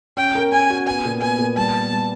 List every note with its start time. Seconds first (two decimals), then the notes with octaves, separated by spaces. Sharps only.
0.17 C#4 G5
0.35 A#4
0.52 C#4 G#5
0.70 F#4
0.86 B3 G#5
1.05 A#2
1.21 B3 G#5
1.39 A#2
1.57 G3 A5
1.74 B3
1.92 G3